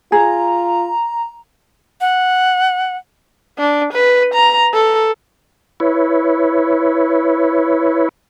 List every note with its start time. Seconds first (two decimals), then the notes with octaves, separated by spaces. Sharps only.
0.12 F4 G#4 A#5
2.01 F#5
3.59 D4
3.94 B4
4.35 A#5
4.74 A4
5.80 E4 B4 C#5